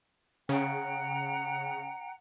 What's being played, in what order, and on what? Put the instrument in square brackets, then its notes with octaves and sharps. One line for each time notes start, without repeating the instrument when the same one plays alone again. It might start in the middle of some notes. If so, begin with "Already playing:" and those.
[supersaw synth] C#3 [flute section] F#5 G5 A#5